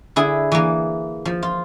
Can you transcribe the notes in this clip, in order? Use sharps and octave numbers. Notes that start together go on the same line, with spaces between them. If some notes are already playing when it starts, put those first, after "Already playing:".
D3 E4 G#4
E3 A#3
F3
F4